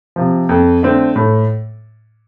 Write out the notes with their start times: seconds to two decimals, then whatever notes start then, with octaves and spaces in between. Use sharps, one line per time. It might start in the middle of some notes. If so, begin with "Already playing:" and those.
0.16 C3 F3
0.49 F2
0.83 D3 A3 C4
1.16 A2